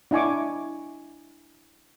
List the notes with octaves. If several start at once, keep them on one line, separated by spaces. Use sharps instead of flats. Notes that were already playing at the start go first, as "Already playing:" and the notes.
D4 E4 D#5 G#5 C#6 D6